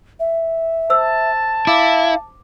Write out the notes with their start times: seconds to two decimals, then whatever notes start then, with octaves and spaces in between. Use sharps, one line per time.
0.20 E5
0.90 C5 A5 E6
1.67 E4 F5 D6